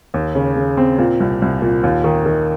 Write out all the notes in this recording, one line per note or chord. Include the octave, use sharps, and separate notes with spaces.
D#2
C#3
C#3
C4
A#2
C2
C2
A#2
D#2
D#3
D#3